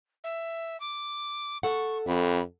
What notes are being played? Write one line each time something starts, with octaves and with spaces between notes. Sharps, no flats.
E5
D6
A4 F#5 C#6
F2 B5